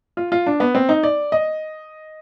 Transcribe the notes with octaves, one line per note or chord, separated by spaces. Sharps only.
F4
F4
D4
B3
C4
D#4
D5
D#5